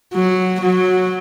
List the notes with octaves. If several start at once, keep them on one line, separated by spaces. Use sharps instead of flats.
F#3
F#3